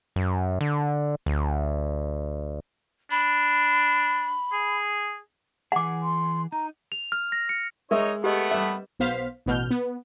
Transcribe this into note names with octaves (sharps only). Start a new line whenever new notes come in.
F#2
D3
D2
D4 B5
G#4
E3 G#4 F#5 D6
C6
D#4 A#5
F7
F6
A#6
C#7
G#3 D#4 A#4 C#5 D#5 E5
A3 B3 G4 D#5 F#5
G3 B4 E5
B1 B3 C5 F5 B6
A1 B2 F6 G6
B3